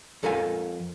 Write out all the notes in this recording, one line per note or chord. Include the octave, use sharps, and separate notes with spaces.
F2 A4 A#4 F5 G#5